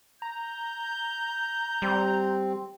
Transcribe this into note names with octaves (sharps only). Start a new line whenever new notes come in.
A#5 G6
G3 C4